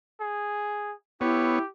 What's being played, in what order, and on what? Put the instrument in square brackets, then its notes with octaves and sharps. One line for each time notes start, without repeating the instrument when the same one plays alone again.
[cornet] G#4
[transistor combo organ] B3 C#5 [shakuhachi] E4 [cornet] G4